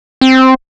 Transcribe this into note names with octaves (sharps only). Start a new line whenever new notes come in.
C4